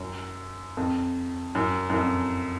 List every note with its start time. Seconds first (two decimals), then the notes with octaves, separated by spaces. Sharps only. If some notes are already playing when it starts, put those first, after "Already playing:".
Already playing: F#2
0.77 F2
1.55 F#2
1.90 F#2
1.94 F2